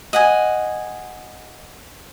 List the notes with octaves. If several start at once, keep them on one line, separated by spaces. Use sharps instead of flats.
D#5 F#5 G#5